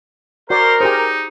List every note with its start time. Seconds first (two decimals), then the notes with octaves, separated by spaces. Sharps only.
0.50 F#4 A#4 C5 D5
0.81 D#4 G4 G#4 C5